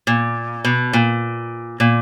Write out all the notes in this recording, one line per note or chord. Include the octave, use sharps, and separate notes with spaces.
A#2
B2
A#2
A#2